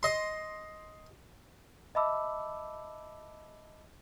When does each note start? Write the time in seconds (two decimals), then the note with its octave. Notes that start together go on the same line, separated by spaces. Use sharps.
0.03 D#5 C6
1.95 D#5 E5 A5 B5 D6 E6